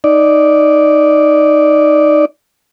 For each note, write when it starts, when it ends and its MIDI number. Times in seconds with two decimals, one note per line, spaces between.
0.04 2.25 63
0.04 2.25 74